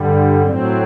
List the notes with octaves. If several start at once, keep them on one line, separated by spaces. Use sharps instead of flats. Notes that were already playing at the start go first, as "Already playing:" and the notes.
Already playing: G2 D3 G3
A2 F#3 C4